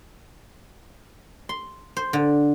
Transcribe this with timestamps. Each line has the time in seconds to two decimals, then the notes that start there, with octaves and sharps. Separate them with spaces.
1.49 C6
1.97 C5
2.13 D3